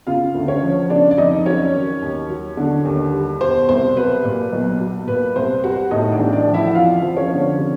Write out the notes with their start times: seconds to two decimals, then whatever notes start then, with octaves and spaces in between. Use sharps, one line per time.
0.07 C#3 F4 F5
0.35 D2
0.48 C#4 C#5
0.63 F3
0.90 C#3 D4 D5
1.11 D5
1.18 F2 D#4 D#5
1.46 F#3 C#4 C#5
1.74 D#3
2.02 D#2
2.29 F#3
2.57 D3
2.85 D#2
3.13 G3
3.41 B2 C5
3.69 C2 C5
3.96 F#3 B4
4.24 A#2
4.53 B1
4.80 F#3
5.07 A#2 B4
5.36 C2 C5
5.64 G3 F#4 F#5
5.91 A2 D#4 D#5
6.12 D4 D5
6.19 A1
6.33 D4 D5
6.47 F3
6.54 E4 E5
6.67 F#5
6.75 F2 F4 F5
7.02 F3
7.17 C#4 C#5
7.31 D3
7.58 C3